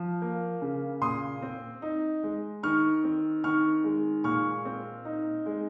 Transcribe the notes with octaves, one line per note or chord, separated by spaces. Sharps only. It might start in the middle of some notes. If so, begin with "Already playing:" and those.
Already playing: F3
A#3
C#3
A#2 C6 D#6
C4
D#4
G#3
D#3 C#6 F6
C4
D#3 C#6 F6
G#3
A#2 C#6 F6
C4
D#4
G#3